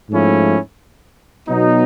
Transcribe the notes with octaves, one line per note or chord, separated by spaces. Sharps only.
G#2 F3 A3 C#4 E4
B2 F#3 B3 D#4